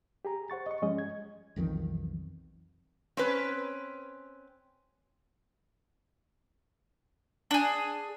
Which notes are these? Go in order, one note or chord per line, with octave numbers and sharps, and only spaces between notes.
G4 G#4 A#5
C5 F#5 C#6 A6
D#5 C#6
G2 F3 G3 G#3 C#4 D#5
G#6
B1 F2 D#3 E3
C4 C#4 B4
D4 G#4